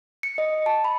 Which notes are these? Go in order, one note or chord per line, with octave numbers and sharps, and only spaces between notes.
C#7
D#5
A5
B5